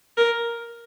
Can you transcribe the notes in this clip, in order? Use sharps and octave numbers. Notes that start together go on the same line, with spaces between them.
A#4